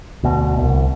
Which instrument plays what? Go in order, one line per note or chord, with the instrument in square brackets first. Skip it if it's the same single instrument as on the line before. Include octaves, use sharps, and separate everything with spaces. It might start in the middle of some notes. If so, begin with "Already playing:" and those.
[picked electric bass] D2 B2
C2